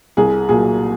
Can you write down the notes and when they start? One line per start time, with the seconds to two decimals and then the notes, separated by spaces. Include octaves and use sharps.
0.17 C2 G#4
0.49 A#2 F#3 G#4